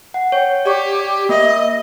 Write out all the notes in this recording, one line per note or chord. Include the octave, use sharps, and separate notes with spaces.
F#5
C#5 G5
G4 D5 G5 C#6
D5
A#3 D#5 E5